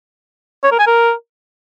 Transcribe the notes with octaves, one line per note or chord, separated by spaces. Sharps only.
C#5
A#4
G#5
A#4